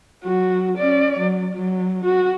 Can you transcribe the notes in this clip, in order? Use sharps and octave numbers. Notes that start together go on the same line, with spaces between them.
F#3 F#4
C#4 D5
F#3
F#3
F#4